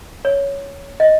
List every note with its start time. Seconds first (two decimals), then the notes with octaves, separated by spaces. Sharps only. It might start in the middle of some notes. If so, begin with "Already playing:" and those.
0.25 C#5
1.00 D#5